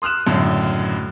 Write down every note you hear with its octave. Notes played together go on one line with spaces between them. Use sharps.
C6 D#6 F6 F#6 E7
C#2 F#2 A2 D3